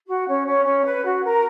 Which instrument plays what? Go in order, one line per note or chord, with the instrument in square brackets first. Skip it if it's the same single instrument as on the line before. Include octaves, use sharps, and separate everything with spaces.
[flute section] F#4
C#4
C#4
C#4
B4
F#4
A#4